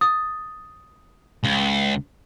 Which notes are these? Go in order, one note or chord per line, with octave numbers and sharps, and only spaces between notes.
D#6 A6
C#2